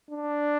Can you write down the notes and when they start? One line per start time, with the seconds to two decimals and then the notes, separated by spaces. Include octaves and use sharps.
0.11 D4